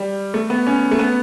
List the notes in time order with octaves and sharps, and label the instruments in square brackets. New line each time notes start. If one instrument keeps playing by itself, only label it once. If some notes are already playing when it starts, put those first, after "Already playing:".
Already playing: [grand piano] G3
A3
B3
C#4
A3
B3